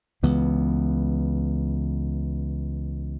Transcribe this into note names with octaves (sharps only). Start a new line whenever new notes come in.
C#2 C#3 E3 B3